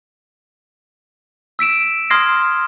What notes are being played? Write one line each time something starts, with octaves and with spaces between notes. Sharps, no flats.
E6 B6 D7 E7
C6 D#6 F6 G#6 A#6 C7